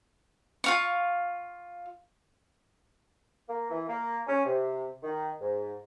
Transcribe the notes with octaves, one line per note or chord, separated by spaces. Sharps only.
F4 F5 C#6
A#3
E3
A#3
C#4
C3
D#3
G#2